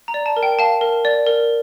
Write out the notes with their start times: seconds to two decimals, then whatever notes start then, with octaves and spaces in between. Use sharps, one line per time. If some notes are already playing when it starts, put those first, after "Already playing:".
0.08 A#5
0.14 D5
0.26 A5
0.37 A#4
0.43 G5
0.59 F5 A5
0.81 A#4
1.05 D5
1.26 A#4